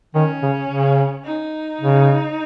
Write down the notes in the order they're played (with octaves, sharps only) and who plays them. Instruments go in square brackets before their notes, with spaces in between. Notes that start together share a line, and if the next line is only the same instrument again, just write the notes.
[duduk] D#3 [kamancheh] C#4
[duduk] C#3
C#3
[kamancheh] D#4
[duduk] C#3